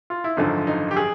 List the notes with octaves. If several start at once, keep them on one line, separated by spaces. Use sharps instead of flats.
F4
E4
G#1 F#2 D3 F3 D#4
D#4
G4
G#4